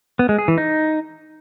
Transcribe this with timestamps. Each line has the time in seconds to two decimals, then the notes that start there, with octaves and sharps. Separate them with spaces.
0.19 B3
0.29 G#3
0.38 G#4
0.48 E3
0.58 D#4